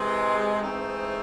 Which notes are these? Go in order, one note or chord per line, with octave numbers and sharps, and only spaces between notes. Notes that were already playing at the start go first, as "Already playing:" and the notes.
Already playing: C3 E3 G#3
G#2 E3 A3 C4 D#4